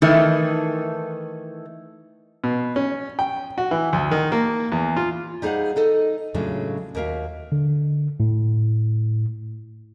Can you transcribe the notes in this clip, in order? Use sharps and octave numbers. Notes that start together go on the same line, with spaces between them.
D#3 E3 A3
B2
C#4
G5
F#4
E3
D2
D#3
A#3
E2
F4
G3 D#4 G#4 C5 F5 F#5
D#4 A4 D#5
A2 C#3 F#3 G#3 D4 F4
D#2 F#4 A#4 E5 F5
D3
A2